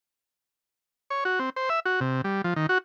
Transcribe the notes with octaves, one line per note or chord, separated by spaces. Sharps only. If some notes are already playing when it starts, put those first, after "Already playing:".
C#5
F#4
C4
C5
E5
F#4
C3
G3
F3
D#3
F#4